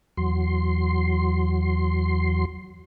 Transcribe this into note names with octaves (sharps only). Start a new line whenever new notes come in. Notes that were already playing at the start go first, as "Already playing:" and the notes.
E2 F#3 C6